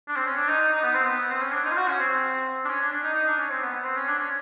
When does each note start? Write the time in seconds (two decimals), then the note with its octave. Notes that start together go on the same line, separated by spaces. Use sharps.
0.08 D4
0.16 C4
0.26 C#4
0.36 D4
0.48 D#4
0.60 D#4
0.72 D#4
0.83 B3
0.94 C4
1.03 B3
1.30 C4
1.41 C#4
1.52 D4
1.64 D#4
1.71 F4
1.76 F#4
1.88 C#4
1.99 C4
2.65 D4
2.69 C#4
2.81 D4
2.92 D4
3.04 D#4
3.15 D#4
3.27 D4
3.39 C#4
3.50 C4
3.62 B3
3.73 B3
3.84 C4
3.96 C#4
4.08 D4
4.19 C#4